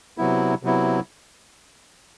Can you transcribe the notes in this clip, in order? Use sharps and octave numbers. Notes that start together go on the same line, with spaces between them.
C3 F#3 B3 E4
C3 F#3 B3 E4